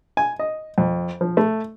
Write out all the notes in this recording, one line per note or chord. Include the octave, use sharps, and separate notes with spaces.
G#5
D#5
F2
F3
A3